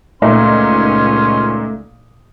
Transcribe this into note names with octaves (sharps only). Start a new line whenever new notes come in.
C#2 A#2 A3 C#4 D#4 C6